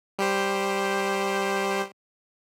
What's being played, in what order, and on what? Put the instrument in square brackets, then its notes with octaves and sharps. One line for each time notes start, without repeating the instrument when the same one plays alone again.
[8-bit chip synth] G3 G4 C5